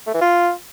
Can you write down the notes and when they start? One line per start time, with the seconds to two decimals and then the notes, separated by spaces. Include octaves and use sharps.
0.07 A3
0.14 E3
0.21 F4